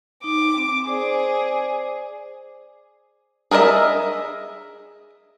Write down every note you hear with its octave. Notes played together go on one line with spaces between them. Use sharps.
D#4 D6
C4
G#4 C5 D5 D6
G#4 A#4 B4 D#5 E5